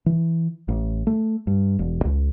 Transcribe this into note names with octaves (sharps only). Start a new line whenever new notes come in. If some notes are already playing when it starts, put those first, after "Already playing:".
E3
A1
A3
G2
E1
C#2